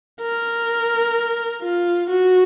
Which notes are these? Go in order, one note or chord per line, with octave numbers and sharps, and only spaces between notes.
A#4
F4
F#4